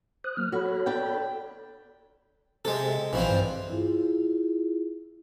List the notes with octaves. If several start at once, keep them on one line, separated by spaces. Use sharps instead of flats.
C5 D#6 F#6
F#3 A#3 F6
F#4 A4 C#5 B5
D4 G5
C3 G#3 A4
A#1 E3 F3 C4
G2
E4 F4 G#4